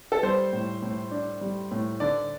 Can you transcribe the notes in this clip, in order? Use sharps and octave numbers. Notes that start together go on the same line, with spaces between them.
A4
G3 C5
A2
A2
D4
G3
A2
D3 D5